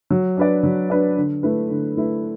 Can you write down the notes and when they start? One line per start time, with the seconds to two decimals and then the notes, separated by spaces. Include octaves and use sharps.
0.11 F#3
0.37 D4 B4 D5
0.63 F#3
0.90 D4 B4 D5
1.17 D3
1.43 A3 E4 B4
1.70 D3
1.97 A3 E4 B4